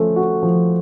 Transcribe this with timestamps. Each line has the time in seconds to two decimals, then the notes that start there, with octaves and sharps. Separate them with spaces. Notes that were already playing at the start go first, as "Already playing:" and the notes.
Already playing: F3 A3 C#4
0.16 F#4
0.43 F3